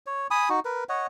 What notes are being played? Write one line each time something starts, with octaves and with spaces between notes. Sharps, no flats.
C#5
G#5 B5 D#6
D#4 F#4
A#4 B4
C#5 D#5 F#5